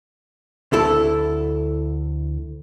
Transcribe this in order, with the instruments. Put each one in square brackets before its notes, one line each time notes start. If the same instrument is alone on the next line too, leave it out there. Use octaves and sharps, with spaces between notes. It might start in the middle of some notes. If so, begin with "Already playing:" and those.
[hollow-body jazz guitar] D2 E4 A4